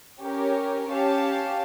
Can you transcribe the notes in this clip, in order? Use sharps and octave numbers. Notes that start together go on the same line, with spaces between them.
C#4 G4 A#4 C#5
C#4 G4 C#5 F5 A5